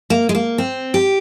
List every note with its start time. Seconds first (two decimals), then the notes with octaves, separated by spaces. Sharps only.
0.10 A#3
0.29 G#3
0.35 A#3
0.58 C4
0.94 G4